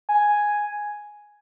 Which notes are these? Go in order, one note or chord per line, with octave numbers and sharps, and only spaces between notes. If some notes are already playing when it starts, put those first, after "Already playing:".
G#5